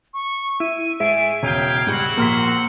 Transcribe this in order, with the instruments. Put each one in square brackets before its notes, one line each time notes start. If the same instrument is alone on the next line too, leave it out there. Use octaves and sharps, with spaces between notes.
[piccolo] C#6
[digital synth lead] E4 [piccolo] D#7
[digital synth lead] G#2 [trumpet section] A3 G#4 G#5 [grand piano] E5 [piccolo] D7
[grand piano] E1 [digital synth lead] C#3 [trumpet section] E5 F5 G5 [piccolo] G#6
[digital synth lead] G#2 [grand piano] G3 [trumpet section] C4 F#4 F#5
[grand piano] A#1 F6 B6 [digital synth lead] A#3 [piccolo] C6